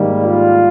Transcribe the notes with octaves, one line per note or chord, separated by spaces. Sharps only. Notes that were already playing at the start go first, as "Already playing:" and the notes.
Already playing: G#2 D#3 G3 A#3
F4